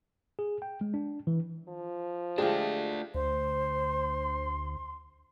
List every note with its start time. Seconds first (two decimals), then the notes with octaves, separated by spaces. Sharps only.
0.39 G#4
0.62 G5
0.81 G#3
0.94 D4
1.27 E3
1.69 F3
2.38 G#3 A3 D4 F4 G4
3.15 D2 C5 C6